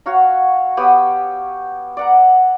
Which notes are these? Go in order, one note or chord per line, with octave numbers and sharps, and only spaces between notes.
F#4 C#5 F5 A#5
B3 G4 C#5 D#6
D5 F#5 A#5